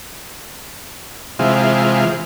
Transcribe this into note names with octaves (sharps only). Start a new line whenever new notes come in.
C3 E3 G#3 F4